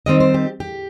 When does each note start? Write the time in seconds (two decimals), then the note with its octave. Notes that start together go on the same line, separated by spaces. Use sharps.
0.06 D#3 G3 C4 D#4 D#5
0.20 C5
0.34 G4
0.60 G4